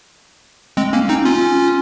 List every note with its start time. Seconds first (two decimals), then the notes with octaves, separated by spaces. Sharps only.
0.77 G#3 C4
0.93 A#3 C#4
1.09 C4 D#4
1.25 C#4 F4